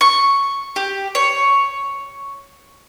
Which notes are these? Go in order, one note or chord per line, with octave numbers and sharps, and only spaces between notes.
C#6
G4
C#5